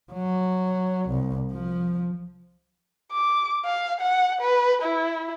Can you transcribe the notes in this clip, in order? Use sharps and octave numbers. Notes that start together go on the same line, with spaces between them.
F#3
C2
F3
D6
F5
F#5
B4
E4